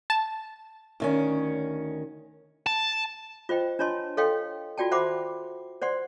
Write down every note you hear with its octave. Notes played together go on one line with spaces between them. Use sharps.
A5
D2 D#3 C#4
A5
F4 C5 D#5 G5
D4 F4 C#5 D#5 A5 C6
A4 C#5 D#5 F5 G5 C6
F4 F#4 D5 G5 A5
C5 E5 F#5 B5 C6 D6
C5 D5 F#5 C6